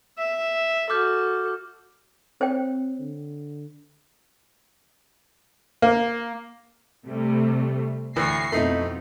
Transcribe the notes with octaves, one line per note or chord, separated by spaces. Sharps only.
E5
F#4 A4 D6 F6 G6
C4 C5 C#5 G5
D3
A#3
C3 G3 A3
D2 A2 E3 C#6 A#6 C7
F2 B2 A3 D#4 E4